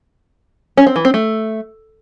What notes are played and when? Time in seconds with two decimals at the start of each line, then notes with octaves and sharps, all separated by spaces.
0.77 C#4
0.87 C4
0.96 E3
1.05 C4
1.14 A3